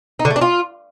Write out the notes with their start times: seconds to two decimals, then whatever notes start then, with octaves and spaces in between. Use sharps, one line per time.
0.19 D#4
0.25 D3
0.30 A3
0.36 D4
0.41 F4